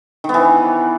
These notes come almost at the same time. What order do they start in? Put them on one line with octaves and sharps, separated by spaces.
D#3 B3 E3